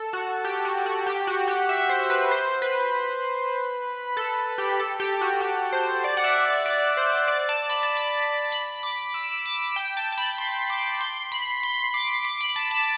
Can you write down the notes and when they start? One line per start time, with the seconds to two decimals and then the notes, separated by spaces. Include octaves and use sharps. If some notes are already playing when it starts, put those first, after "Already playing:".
Already playing: A4
0.13 F#4
0.44 G4
0.65 F#4
0.86 F#4
1.07 G4
1.27 F#4
1.48 G4
1.69 E5
1.89 C5
2.10 B4
2.31 C5
2.62 B4
4.17 A4
4.58 G4
4.80 A4
5.00 G4
5.21 F#4
5.41 G4
5.72 C5
6.04 D5
6.17 F#5
6.24 E5
6.45 D5
6.66 D5
6.97 C5
7.28 D5
7.49 A5
7.70 B5
7.83 A5
7.97 B5
8.52 B5
8.83 D6
9.14 E6
9.46 D6
9.76 G5
9.97 A5
10.12 A5
10.18 B5
10.38 C6
10.70 D6
11.01 C6
11.32 B5
11.63 C6
11.94 D6
12.25 D6
12.41 B5
12.56 A5
12.71 A5